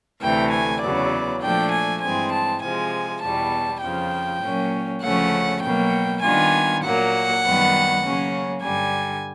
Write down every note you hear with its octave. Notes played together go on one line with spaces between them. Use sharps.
D2 C3 E3 A3 G5
G#5
E2 C#3 F#3 B3 D5
A#2 F3 A3 D4 G5
G#5
G2 E3 G#3 C4 G#5
A5
C3 F3 G#3 G#5
E2 B2 G3 A5
F2 C#3 F3 G5
A#2 F#3 A#3 C#4
D2 C#3 F3 A3 C#4 F#5
B2 F#3 A#3 G5
D#3 G3 B3 D4 F4 G#5
A#2 F#3 A#3 F#5
F#2 D#3 G3 B3
C#3 F#3 A#3 C#4
G2 D3 G3 G#5